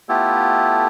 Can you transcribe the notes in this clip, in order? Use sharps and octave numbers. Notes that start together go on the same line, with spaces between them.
A3 B3 E4 F4 G4 A4